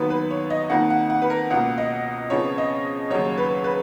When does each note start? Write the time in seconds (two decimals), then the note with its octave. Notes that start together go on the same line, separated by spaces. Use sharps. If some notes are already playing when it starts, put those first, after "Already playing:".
Already playing: D#2 D#3 F#3 B3 B4
0.10 B4
0.30 C#5
0.50 D#5
0.70 F2 D#3 A#3 F#5
0.90 F#5
1.10 F#5
1.22 B4
1.30 A#4
1.50 C#2 B2 A#3 F#5
1.78 D#5
2.30 F2 C#3 F3 B3 C#5
2.58 D#5
3.10 D#2 C#3 F#3 C#5
3.38 B4
3.64 B4